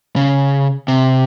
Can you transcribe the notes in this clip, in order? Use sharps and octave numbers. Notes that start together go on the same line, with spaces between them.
C#3
C3